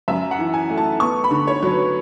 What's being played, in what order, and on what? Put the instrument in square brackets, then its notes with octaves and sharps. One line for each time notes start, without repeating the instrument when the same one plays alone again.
[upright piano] F#2 E5
F#5
E3
G#5
A3
A5
B3 C#6
B5
D3
C#5
F#3
B4